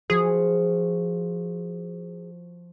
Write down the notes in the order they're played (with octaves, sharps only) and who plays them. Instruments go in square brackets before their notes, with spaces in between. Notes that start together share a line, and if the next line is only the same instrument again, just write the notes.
[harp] F3 F#4 [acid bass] G#4